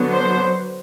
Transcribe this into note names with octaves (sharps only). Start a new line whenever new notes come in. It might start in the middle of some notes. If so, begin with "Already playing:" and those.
Already playing: D3 F#3 B3
C5